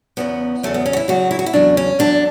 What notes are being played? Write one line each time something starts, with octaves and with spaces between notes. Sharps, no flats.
E2 C#3 F#3 B3
E2 C#3 F#3 A3
B3
C#4
F#4
E4
E2 C#3 F#3 F#4
E4
F#4
E4
E2 C#3 F#3 D4
C#4
E2 D3 F#3 D4